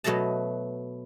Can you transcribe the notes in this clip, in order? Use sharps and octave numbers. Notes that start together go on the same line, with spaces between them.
B2 F#3 A3 D#5 A5